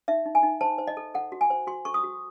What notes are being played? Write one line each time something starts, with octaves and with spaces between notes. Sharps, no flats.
D#4 E5
D#4
G#5
D#4
C5 A5
C5
D#5
A4
A4 F#5
F#4
G#5
C5
F#4 C6
A4 C#6
D#6
F#4